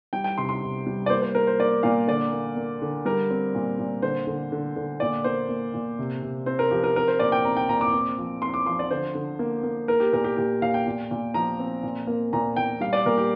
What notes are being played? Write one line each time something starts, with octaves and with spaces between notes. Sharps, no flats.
G3 G5
G5
C3 C6
C6
C3
G3
D5
A#3 C5
C5
A#3 A#4
C5
A#3 D5
A#2 F5
D3 D5
A#3
A#3
D3
G3 A#4
C4
A#2
A#2
D3 C5
D3
D3
D3
A#2 D5
A#3 C5
A#3
A#2
C3
C3
C4 C5
A#4
F3 G4
A#4
C4 A#4
C5
A#2 D5
G5
C4 A#5
G5
A#2 A#5
D6
C4
F3
C4 C6
D6
F3 C6
D5
D3 C5
D3
A#3
A#3
A#3 A#4
G4
A#2 A#4
G4
A#2 G4
A#2 F5
G5
A#2
A#2
F3 A#5
C4
A#2
A#3
A#2 A#5
A#2 G5
G3 F5
D5
A#2 A#4
G4